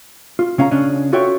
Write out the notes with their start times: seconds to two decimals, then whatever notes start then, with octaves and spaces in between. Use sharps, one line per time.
0.39 F4
0.58 C#3 C#4 F5 F#5 A#5
0.71 C#3 C#4 D4 D#5
1.13 F4 F#4 A4 C#5 E5 G5